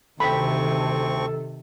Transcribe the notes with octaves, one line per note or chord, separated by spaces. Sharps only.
D2 C3 D#3 C4 A4 G5 B5 C#6